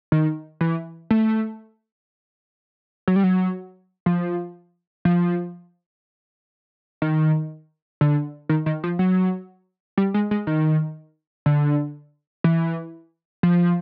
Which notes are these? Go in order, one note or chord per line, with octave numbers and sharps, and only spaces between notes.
D#3
E3
A3
F#3
G3
F#3
F3
F3
D#3
D3
D#3
D#3
F3
F#3
G3
G#3
G#3
D#3
D3
E3
F3